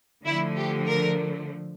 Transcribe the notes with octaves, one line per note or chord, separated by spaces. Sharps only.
D3 F3 A3 E4
G4
A#4